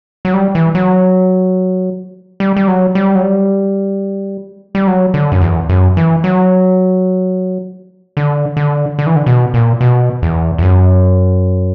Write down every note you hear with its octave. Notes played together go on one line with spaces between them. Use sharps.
F#3
G3
E3
F#3
G3
G3
F#3
G3
F#3
G3
G3
F#3
D3
F#2
E2
F#2
E3
F#3
D3
D3
D3
E3
D3
B2
A#2
B2
E2
E2
F#2